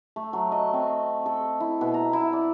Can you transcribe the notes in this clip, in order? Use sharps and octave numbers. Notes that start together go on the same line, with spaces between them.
A3
F#3
D#5
C4
A4
E4
B2
A#5
E4
D5